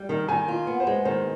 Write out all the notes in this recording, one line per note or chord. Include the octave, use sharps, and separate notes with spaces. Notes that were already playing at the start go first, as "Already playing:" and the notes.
Already playing: G3
D#3
D#3 G#5
F4
B3
C5
G#3
D#3 C5